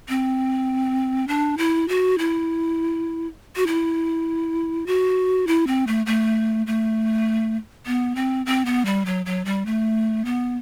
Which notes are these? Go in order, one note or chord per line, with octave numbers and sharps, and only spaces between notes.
C4
D4
E4
F#4
E4
F#4
E4
F#4
E4
C4
A3
A3
A3
B3
C4
C4
B3
G3
F#3
F#3
G3
A3
B3